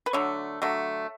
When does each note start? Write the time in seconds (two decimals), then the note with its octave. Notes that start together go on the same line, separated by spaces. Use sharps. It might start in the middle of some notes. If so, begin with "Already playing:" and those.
0.06 B4
0.13 D3 F#3 A3 C#5
0.62 D3 F#3 A3